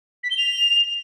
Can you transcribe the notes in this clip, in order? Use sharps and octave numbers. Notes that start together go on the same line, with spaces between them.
B6
G7
F7